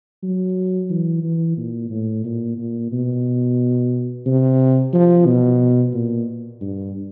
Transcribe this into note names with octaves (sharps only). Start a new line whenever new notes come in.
F#3
E3
E3
A#2
A2
A#2
A#2
B2
C3
F3
B2
A#2
G2